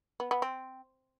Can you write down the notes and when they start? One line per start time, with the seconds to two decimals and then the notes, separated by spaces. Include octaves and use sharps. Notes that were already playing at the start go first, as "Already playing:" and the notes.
0.20 B3
0.31 B3
0.42 C4